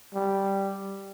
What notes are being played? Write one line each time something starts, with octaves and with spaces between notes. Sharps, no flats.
G3